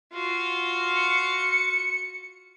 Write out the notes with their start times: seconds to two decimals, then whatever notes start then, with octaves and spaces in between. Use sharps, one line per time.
0.13 F4 F#4
0.96 C#7